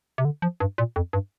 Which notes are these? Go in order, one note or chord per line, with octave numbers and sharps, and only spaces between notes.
C3
D3
F3
G2
A#2
F2
G2